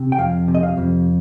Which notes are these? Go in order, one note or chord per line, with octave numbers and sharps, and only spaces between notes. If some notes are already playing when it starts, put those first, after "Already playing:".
Already playing: C3
G5
F2 F5
C3
D#5
F5
F2